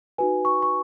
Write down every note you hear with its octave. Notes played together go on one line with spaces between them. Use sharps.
D#4 F#4 B4 G#5
C#6
C#6